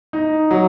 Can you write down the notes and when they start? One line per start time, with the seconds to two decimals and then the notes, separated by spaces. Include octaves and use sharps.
0.13 D#4
0.51 F#3